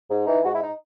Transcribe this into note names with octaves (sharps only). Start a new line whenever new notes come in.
G#2
E3 D#4
G#2 F#4
E4
D#4